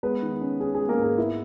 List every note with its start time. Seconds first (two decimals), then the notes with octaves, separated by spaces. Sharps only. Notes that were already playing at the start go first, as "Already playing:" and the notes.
0.03 G#3 B3 B4
0.22 D#3
0.41 C#4
0.60 C#4 G#4
0.75 G#4
0.80 G#3
0.89 A#3 A#4
0.99 G#2 G#4
1.17 B3 E4 E5